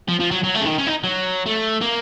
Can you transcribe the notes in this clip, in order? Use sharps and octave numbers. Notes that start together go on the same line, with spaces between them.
F3
F3
F#3
F#3
A3
C#3
D#3
C#4
D#4
F#3
A3
A#3